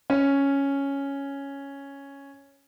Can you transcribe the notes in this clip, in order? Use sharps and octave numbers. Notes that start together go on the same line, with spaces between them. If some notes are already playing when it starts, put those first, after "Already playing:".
C#4